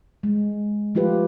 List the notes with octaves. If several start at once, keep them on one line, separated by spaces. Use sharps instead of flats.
G#3
F3 A3 F4 G4 B4